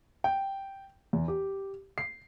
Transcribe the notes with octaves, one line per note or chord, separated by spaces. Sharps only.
G5
E2
G4
C7